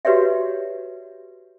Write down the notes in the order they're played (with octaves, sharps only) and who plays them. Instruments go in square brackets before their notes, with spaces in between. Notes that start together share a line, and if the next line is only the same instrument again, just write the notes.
[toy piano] F#4 G4 B4 C#5 D5 E5